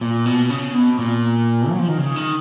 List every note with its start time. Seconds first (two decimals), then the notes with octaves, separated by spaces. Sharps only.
0.01 A#2
0.26 B2
0.50 C#3
0.75 B2
0.99 A#2
1.70 F#3
1.79 F3
1.88 D#3
1.98 C#3
2.16 D#3